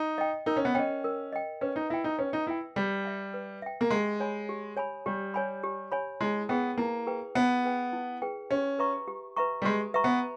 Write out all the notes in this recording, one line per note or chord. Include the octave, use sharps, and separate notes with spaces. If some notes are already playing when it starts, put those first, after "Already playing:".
Already playing: D#4
D#5 G5
D#4 A#4
C#4
B3
C#4 D#5 G5
A#4
D#5 G5
C#4 B4
D#4
E4 E5 G5
D#4
C#4 B4
D#4
E4 E5 G5
G3 B4
E5 G5
B4
E5 G5
A#3
G#3 G4
C#5 G#5 B5
G4
C#5 G#5 B5
G3 G4
C#5 G#5 B5
G4
C#5 G#5 B5
G#3 E4
B3 G#4 B4 G5
A#3 E4
G#4 B4 G5
B3 E4
G#4 B4 G5
E4
G#4 B4 G5
C#4 G4
B4 E5 A#5 C#6
G4
B4 E5 A#5 C#6
G3
G#3 G4
B4 E5 A#5 C#6
B3